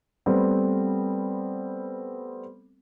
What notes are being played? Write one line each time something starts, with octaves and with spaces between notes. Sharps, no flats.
G3 A3 B3 C4